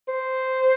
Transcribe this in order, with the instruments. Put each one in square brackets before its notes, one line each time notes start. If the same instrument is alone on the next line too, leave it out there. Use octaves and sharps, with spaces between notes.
[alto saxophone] C5